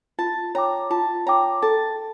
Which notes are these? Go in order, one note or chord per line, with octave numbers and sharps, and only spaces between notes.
F4 A5
C#5 G5 A#5 D6
F4 A5
C#5 G5 A#5 D6
A4 A5